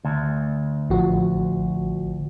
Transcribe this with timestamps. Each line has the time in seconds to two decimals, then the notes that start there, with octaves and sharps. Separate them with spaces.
0.05 D2
0.89 A1 F3 F#4